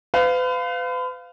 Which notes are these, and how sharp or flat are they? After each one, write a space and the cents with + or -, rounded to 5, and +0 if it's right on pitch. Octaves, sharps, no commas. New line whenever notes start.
B4 +40 F5 +0